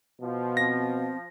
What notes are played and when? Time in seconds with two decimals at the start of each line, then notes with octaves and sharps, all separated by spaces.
0.22 B2 F3
0.57 C4 A#6